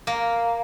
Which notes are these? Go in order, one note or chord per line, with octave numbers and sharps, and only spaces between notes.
A#3